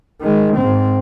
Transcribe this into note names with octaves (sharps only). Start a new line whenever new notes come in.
D#3 G#3
G#2 C4